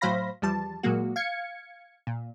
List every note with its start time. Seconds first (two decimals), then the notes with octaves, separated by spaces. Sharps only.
0.01 A2 F#3 C5 F5 B5 A#6
0.42 E2 F3 G3 A5
0.83 A#2 F#3 G#3 A#3 F#4
1.16 F5 G#6 C#7
2.07 A#2